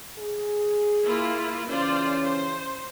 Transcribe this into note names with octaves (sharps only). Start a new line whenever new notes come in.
G#4
A#3 E4 F4
C#3 E3 C#4 F4 C5 D5
C5